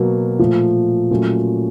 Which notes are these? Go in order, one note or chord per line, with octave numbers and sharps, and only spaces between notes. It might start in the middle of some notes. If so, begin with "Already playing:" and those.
Already playing: B2 F#3 A#3
A#2 F3 A3
A#2 F#3 A3 C#4